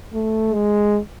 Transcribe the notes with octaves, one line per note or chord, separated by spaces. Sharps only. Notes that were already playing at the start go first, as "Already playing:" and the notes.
A3
G#3